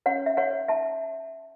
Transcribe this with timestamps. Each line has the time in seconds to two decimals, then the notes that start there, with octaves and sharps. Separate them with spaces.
0.06 C#4 C#5 F#5
0.26 E5
0.37 C#5 F#5
0.53 C#5
0.68 E5 A5